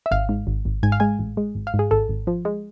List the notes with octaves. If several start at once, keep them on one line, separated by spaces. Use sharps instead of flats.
E5
G#1 F5
G#2
G#1
G#1
G#2 G#5
F5
G#3 G#5
A1
G#3
G#1
F5
G#2
G#4
G#1 A4
G#1
F3
G#3